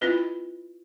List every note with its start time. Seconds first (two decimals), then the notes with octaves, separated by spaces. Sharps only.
0.01 C4 E4 F4 B4 D#5